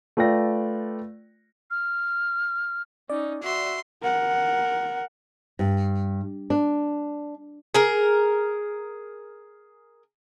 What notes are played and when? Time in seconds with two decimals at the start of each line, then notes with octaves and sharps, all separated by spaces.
0.17 A3 F4 B4 D5 G5 A#6
1.71 F6
3.10 C#4 D#4 D5
3.44 F#4 E5 C6
4.03 A#4 F#5
5.59 G2
6.50 D4
7.74 G#4 A#4